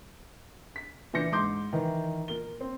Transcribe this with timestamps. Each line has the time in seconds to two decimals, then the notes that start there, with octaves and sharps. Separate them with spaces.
0.76 B6
1.13 A#2 E3 D4 G6 A#6 C#7
1.32 G#2 C6 D6 G6
1.73 D#3 E3
2.28 A#2 A#4 G7
2.61 C4